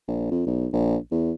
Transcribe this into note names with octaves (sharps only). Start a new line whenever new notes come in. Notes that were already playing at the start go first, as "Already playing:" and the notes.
A#1
F2
B1
A#1
E2